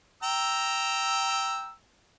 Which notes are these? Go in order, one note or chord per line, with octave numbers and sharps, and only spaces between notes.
G5 A#5 E6